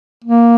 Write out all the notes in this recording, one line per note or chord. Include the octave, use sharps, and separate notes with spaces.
A#3